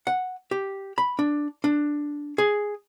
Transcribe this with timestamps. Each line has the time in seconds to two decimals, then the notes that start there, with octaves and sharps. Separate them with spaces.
0.07 F#5
0.51 G4
0.98 B5
1.19 D4
1.64 D4
2.38 G#4